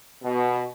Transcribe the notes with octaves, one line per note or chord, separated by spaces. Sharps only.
B2